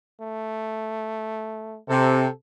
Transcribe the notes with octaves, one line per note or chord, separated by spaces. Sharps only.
A3
C3 A4